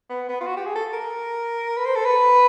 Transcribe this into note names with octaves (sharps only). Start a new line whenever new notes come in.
B3
B3
F4
F#4
G4
G#4
A4
A#4
B4
C5
A4
B4